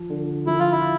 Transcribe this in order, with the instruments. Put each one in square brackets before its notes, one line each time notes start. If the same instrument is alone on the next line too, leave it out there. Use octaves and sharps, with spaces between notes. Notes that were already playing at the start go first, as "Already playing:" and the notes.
Already playing: [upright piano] F3
D3
[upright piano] F3 [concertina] E4
[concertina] F4
E4